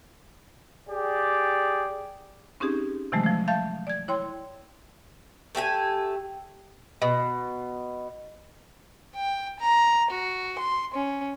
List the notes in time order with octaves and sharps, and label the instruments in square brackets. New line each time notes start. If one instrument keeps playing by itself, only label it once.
[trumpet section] G4 G#4 D5
[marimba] C4 C#4 D#4 G4 G#4
C3 D#3 E3 F#3 G#3 A3
F3 A3
E5 F5 A5 G6 A6
D5 G#6
E4 C#5 G5 C6
[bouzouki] A3 G4 G5 G#5
B2
[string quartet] G5
A#5
F#4
C6
C#4